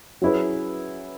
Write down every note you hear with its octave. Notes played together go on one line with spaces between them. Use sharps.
F#3 C#4 E4 G#4 B4